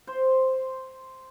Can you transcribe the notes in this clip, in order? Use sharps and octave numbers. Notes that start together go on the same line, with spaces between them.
C5